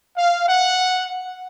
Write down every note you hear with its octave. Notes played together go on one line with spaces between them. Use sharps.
F5
F#5